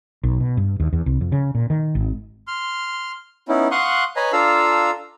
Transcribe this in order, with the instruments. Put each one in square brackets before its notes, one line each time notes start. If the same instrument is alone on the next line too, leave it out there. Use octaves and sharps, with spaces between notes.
[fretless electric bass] B1
B2
G2
D#2
E2
C2
F2
C#3
A#2
D#3
G#1
[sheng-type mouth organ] C6 F6
B3 C#4 D#4 E4
F5 F#5 C6 C#6 D#6 F#6
B4 C#5 D#5 G#5 A#5 B5
D4 F4 A4 F5 A#5 E6